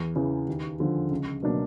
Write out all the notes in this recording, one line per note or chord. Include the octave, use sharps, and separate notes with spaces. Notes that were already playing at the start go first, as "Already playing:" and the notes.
Already playing: E2
C#3 E3
D#2
D3 F3
C#2
B2 F#3 A#3 D4